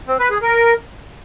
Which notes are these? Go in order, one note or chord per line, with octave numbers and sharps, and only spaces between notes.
C4
B4
G#4
A#4